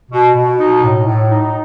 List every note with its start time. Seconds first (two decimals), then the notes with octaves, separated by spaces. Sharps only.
0.11 B2
0.35 B2
0.59 D#4
0.82 A2
1.05 A2
1.29 D#4